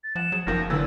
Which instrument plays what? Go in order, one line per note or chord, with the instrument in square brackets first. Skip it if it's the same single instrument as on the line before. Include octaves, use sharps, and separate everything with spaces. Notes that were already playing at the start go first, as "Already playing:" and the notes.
[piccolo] A6
[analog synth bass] F3 [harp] F#5 [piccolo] E7
[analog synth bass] F#3 [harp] G#4
[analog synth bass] F#1 [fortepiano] F#2 D#3 F3 [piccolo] A#6
[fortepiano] A#2 E3 [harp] D3 F#3 [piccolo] E6